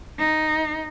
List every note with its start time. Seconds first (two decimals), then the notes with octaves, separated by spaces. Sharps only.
0.19 D#4